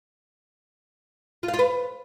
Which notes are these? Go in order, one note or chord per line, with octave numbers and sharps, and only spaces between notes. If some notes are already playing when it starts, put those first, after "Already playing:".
F4
F5
F4
B4